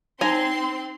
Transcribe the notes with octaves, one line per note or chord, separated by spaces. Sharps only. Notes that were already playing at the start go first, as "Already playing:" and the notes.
C4 D#4 E4 G#5 A#5 C6